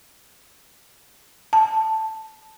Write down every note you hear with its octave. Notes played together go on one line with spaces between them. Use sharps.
A5